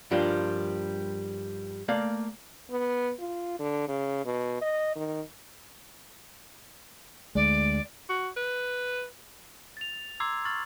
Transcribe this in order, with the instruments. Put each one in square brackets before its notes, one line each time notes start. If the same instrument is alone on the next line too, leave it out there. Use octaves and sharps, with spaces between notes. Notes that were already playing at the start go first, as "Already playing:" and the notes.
[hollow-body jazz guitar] G2 F3 G3 A#3 D4 F4
A3 A#3 D5 F5
[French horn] B3
F4
D3
C#3
B2
D#5
D#3
[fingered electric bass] D2 G#3 [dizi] D5
[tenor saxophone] F#4
B4
[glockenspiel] A6 F7
A#5 C6 D6 E6 G#6 C7
C#6 F6 A6 F#7